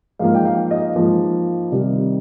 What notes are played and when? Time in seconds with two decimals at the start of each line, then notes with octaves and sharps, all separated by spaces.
0.19 G#2 F3 A#3 F5
0.35 G5
0.45 F5
0.71 D#5
0.96 G#2 F3 A#3
1.72 C3 D#3 G3